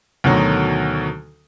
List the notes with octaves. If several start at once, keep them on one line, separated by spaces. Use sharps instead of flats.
D2 B2 D3 D#3 F#3